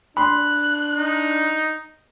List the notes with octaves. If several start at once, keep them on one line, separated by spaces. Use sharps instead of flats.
D4 B5 C6 F#6
D#4